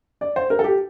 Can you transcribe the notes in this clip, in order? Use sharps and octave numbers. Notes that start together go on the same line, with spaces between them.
D5
C5
A#4
A4
G4